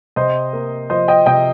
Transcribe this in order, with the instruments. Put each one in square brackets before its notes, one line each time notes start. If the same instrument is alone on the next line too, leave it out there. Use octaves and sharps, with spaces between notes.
[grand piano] C3 C5 D#5
A#3
F3 C5 D#5
D#5 G5
C3 D#5 G5